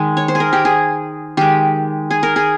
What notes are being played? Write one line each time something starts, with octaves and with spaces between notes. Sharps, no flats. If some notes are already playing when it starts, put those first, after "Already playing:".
Already playing: D#3 G#3
C#5
C5
G#4
A#4
G4
G#4
D#3 G#3 G4
G#4
A#4
G#4